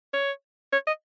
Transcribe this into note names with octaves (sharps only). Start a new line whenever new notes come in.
C#5
C#5
D#5